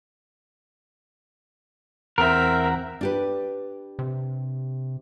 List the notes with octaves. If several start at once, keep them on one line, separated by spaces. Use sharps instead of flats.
E2 C4 A#4 E5 F#5 A#5
D4 G4 B4
C3